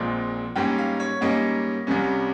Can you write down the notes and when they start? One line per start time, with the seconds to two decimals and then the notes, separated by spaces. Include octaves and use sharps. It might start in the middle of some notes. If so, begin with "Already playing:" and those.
Already playing: A#1 A#2 G#3 C4
0.56 G#2 G3 A#3 C#4 G5
0.78 F5
1.00 C#5
1.21 G#2 G3 A#3 C#4 D#5
1.87 C2 C3 G3 C#4